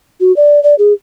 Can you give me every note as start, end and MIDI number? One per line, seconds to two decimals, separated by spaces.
0.20 0.34 66
0.36 0.62 74
0.63 0.75 74
0.79 0.93 68